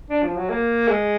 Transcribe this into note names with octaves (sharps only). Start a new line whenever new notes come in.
D4
F3
F#3
A#3
G#3